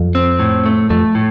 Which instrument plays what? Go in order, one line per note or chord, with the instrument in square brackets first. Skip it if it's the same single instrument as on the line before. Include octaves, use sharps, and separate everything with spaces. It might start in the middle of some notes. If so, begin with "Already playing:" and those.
Already playing: [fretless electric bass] F2
[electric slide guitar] C4
A2
A3
[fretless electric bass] F2 [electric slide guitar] A3
[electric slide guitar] A2